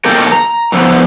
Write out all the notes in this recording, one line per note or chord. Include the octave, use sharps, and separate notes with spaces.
B2 D#3 A#3 G4 A4 A#4
A#5
A2 D3 F3 B3 B4